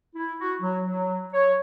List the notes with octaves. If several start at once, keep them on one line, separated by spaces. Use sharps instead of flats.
E4
F#4
F#3
F#3
C#5